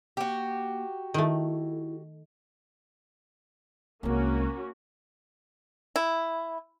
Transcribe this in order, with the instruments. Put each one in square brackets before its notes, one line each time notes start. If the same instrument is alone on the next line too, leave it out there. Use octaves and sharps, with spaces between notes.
[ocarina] A#3 [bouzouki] F#4 G4
[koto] D#3 A3 [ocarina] E4
[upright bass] C2 G#3 [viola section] A#3 C#4 F#4
[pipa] E4